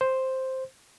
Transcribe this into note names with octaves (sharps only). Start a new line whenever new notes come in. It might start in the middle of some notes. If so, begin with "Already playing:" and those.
C5